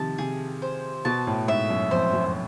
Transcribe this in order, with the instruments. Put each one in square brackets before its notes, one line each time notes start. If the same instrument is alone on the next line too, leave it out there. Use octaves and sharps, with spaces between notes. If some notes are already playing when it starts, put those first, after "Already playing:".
Already playing: [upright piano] C3 D#3 F3 [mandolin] A5
[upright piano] C3 [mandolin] G#4
[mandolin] C5
[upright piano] B2 [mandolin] A5
[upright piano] A2
[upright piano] G#2 [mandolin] E5
[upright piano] F#2
[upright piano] F2 [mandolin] C5
[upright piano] F#2